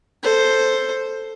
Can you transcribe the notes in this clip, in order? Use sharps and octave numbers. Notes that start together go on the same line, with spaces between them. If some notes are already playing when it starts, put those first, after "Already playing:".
A4 C5